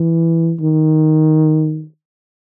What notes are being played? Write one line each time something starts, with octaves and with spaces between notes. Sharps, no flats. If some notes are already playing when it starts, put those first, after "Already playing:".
Already playing: E3
D#3